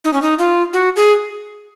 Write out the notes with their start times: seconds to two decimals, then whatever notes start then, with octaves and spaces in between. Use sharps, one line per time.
0.04 D#4
0.13 C#4
0.22 D#4
0.39 F4
0.73 F#4
0.96 G#4